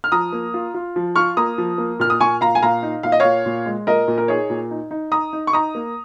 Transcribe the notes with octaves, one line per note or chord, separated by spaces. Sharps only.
F6
F3 A#5 D#6
A#3
F4
F4
F3
F4 C#6 F6
A#3 A#5 D#6
F3
A#3
A#2 F6
D#6
A#2 G#5 C#6
A#2 F5 A#5
G#5
A#2 F5 A#5
D#4
A#2 F5
D#5
A#2 C#5 F5
A#2
G#3
A#2 A#4 D#5
A#2
A#4
D#4 G#4 C#5
A#2
D#4
D#4
D#4 A#5 D#6
D#4
C#6
D#4 A#5 D#6
A#3